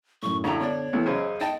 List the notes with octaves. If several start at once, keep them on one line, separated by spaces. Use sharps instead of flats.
F#2 A2 C#6
A#1 A2 D3 A#5
B2 D4 C#5
C2 E3 A3 B3
F#2 C#3 C5 D#5
D#4 D#5 G5 A5